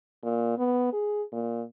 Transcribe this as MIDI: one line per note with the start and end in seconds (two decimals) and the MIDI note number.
0.23 0.57 46
0.58 0.90 59
0.93 1.23 68
1.32 1.63 46